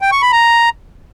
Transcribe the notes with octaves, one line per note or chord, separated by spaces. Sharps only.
G5
C#6
B5
A#5